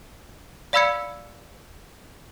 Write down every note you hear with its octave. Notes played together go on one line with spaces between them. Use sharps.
D5 F5 B5 E6 G#6 C#7